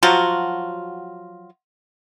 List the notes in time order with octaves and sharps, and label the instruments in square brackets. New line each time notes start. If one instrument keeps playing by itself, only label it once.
[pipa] F3 F#3 F4 F#4